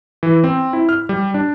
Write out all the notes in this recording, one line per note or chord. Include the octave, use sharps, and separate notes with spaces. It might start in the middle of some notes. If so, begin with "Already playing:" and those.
E3
C4
E4
F6
G3
D4